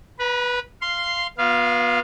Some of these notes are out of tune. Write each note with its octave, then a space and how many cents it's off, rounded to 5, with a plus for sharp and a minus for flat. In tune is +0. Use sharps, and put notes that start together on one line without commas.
B4 -10 A#5 +45
F5 -10 C6 +0
B3 -25 F4 +45 F5 -10